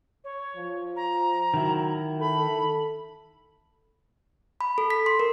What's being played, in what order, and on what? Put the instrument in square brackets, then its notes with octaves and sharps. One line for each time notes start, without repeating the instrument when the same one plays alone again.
[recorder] C#5
[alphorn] F3
[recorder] A#5
[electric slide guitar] D#3 E4 [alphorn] F#3
[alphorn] A4 [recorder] B5
[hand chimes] B5
A4
B6
C6
A#4